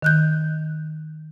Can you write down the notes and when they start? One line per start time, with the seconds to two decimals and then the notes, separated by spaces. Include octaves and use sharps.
0.02 D#3 F#6 G6